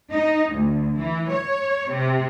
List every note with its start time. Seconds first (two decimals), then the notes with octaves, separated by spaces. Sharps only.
0.11 D#4
0.53 D2
0.98 E3
1.31 C#5
1.91 C3